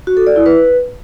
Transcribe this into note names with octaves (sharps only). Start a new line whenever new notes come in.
F#4
A4
D5
E4
B4